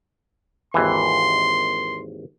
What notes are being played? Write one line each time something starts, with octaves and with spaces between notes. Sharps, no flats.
G#1 D#2 E3 C6